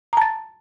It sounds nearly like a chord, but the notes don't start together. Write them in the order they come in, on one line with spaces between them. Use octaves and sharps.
A#5 A5 A6